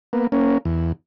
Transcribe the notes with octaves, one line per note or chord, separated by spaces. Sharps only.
A#3 B3
A#3 C#4
E2